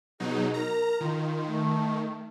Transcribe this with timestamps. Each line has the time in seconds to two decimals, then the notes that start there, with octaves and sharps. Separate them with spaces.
0.20 B2 F#3 D#4 G#4
0.54 A#4 A#5
1.00 D#3 F4
1.47 A3